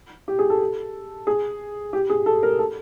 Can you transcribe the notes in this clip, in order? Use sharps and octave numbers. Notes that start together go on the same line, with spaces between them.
G4
G#4
A4
G#4
G4
G#4
A4
A#4
A4